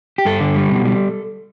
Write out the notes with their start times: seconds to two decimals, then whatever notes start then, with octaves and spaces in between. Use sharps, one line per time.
0.18 G4
0.25 G2 A4
0.40 D3
0.56 G3
0.71 B2
0.86 G3